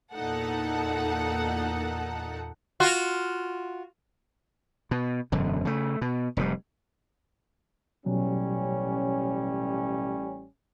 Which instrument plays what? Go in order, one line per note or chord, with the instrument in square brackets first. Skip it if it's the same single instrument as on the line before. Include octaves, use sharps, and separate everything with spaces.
[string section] E2 A#2 D#4 A4 F#5
[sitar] F4 F#4
[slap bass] B2
E1 F#2 D3
C#3 A3
B2
F1 G#2 C3 G3
[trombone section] A1 G3 C#4 [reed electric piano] B2 F#3